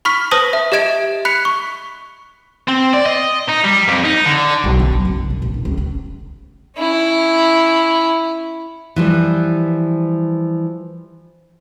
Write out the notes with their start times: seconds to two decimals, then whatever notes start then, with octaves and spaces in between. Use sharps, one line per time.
0.05 B5 C#6 F6 B6
0.31 B4 C5 A5 D#6 A#6 F#7
0.53 E5
0.72 G4 D#5 E5 G#6 D7 E7
1.25 B5 F#6 B6 C#7 F7
1.45 C#6
2.68 C4
2.93 D5
3.06 D#5
3.49 D#4
3.64 G3
3.88 F2
4.04 D#4
4.26 D3
4.64 B1
4.79 D3
4.92 F#3
5.05 F#1
5.30 B2
5.42 A#1
5.54 E2
5.65 C#2
5.77 C#4
6.77 C#4 E4
8.96 E3 F3 G3